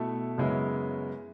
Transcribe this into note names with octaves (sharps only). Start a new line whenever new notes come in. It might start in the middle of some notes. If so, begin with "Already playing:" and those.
Already playing: B2 A3 E4 A4
F#2 C#3 G#3 B3 E4